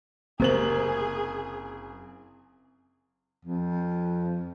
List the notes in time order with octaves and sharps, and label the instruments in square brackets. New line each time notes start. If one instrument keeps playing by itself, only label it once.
[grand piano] F#1 A#3 F#7 [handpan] C4 [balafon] G4 C5 [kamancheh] G#4
[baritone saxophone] F2